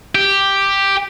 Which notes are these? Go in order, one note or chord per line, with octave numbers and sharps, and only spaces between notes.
G4